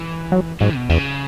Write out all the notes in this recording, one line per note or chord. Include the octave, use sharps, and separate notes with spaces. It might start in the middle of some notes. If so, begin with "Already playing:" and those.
Already playing: E3
F#3
G#2 F#3
B2
E2 C#3